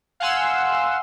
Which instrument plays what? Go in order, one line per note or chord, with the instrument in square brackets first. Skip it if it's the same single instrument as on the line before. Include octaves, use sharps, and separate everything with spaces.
[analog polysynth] F5 F#5 G#5 C6 E6